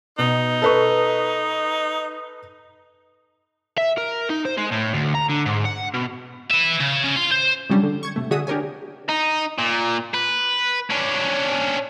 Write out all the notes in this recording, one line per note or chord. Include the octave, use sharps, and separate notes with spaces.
B2 D#4
A4 B4 C#6
E5
A#4
D#4
C5
G#3
A2
D2
A#5
D3
G#2
F#5
B2
B4 E5
C#3
C#3
F5 C6
C5
C#3 F#3 G3 C#4 D4
D3
C#6 G#6
C3 A3
D3 F#4 G#4 E5 D#6
D4 G4 A#4 C#5 G#5
D#4
A#2
B4
C#4 D4